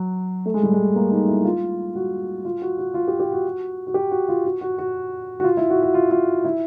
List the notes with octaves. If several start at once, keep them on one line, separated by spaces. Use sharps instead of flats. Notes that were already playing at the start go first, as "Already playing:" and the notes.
Already playing: F#3
A3
G#3
G3
G#3
A#3
D#4
E4
F4
F#4
F4
F#4
F#4
F4
G4
G4
F#4
F#4
G4
F#4
F4
F#4
F#4
F#4
F#4
F4
E4
F#4
F#4
F4
F4
E4